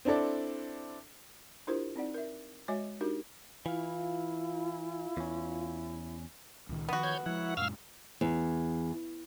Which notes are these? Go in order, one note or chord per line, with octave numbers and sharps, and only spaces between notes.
C4 D4 E4 A4 D5
D4 E4 F4 G4 A#4 C5
C4 D#4 D5 F#5
A#4 E5
G#3 F#4 C#5 D#5 E5 G#5
D4 D#4 F#4 G4 A#4
E3 E4 F4 F5
E2 C#4
C#2 A#2 D#3
D#3 F3 B3 F#4
C#5 G6 G#6
F3 G#3 E4 F#5
F#2 A#2 G#3 F5 E6 F6
E2